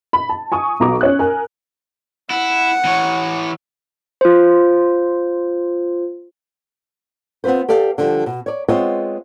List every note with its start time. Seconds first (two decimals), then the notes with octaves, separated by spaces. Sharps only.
0.13 B5
0.29 A5
0.52 G#5 C#6 D#6
0.80 B1 F#3 A#5 C#6 D6
1.01 C#4 C#5 F#6
1.19 A#4 G#5
2.30 E4 F#5
2.85 E3 C#5
4.21 F4 C5
7.44 B3 C4 F4 B4 C5
7.69 G4 A4 D5 F5
7.98 D3 F3 G3
8.26 B2
8.46 C#5 D5
8.68 G#3 B3 C4 F4 C#5 D#5